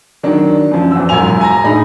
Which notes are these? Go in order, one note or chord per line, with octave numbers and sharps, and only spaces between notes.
D#3 F#3 D4
F#2 F3
E2 E6
E1 B1 G#2 F4 G#5 F7
G#5 A#5 A#6
A2 D4 D#4 G#4 B5 A#6